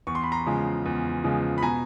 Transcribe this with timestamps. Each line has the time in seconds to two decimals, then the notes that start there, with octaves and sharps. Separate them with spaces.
0.07 E2 C#6
0.15 C6
0.24 B5
0.32 A#5 C6
0.46 C#3 F3 G#3
0.86 E2
1.24 C#3 F3 G#3
1.58 B5
1.63 B2 G#5 A#5